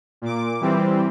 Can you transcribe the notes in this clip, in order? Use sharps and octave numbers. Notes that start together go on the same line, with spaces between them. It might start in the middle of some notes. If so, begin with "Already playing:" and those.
A#2 D6
E3 G3 C4